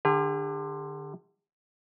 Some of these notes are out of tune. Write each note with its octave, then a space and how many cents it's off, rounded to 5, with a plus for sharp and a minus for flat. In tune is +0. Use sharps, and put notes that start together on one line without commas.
D3 +25 G#4 -45